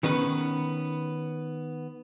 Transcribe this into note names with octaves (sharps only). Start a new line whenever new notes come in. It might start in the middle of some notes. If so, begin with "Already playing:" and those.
D#3 B3 C#4 B4